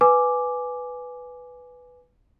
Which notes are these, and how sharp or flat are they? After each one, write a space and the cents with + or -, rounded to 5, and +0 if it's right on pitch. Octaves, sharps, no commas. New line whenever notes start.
B4 +0 G#5 +5 D6 +0